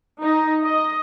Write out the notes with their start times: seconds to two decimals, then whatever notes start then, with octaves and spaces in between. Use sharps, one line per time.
0.21 D#4
0.64 D#5